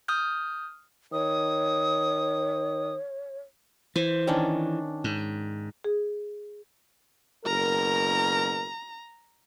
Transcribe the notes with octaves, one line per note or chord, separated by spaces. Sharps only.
D#6 F6 G6
D#3 C#5 D#6
E3 C5
D#3 C#4 D4
G#2
G#4
F#1 B2 A#4 A#5